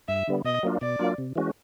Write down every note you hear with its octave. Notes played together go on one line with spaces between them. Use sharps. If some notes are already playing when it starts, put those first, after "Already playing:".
G2 E5
D3 G3 B3
B2 D#5
F#3 A#3 D4 F4
B2 D5
F#3 A#3 D4 F4
C3
E3 G#3 C#4 F#4